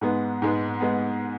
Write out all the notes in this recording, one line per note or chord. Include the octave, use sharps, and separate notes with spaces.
G#2 G#3 B3
G#2 G#3 B3
G#3 B3